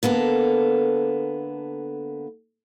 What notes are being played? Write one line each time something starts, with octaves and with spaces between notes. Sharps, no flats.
D3 A#3 B3 A4